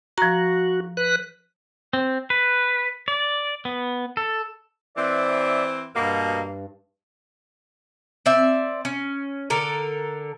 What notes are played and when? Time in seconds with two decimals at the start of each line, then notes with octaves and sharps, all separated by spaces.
0.18 F3 F#4 A#5
0.97 B4 F#6
1.93 C4
2.30 B4
3.08 D5
3.65 B3
4.17 A4
4.97 E3 C4 D5 E5 D6
5.95 G2 B2 A#3
8.26 C4 D5 E5
8.85 C#4
9.50 D3 A4 A#4